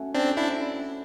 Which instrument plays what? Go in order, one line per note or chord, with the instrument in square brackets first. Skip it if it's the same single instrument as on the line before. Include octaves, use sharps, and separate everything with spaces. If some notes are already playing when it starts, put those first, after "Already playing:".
Already playing: [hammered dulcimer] A3 C#4 F#4
[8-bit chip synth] C4 D4
D4 E4